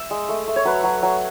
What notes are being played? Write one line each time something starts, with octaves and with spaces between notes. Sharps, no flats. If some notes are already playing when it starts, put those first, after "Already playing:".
Already playing: E5
G#3
A3
A3
C#5
F#3 B4
F#3
F#3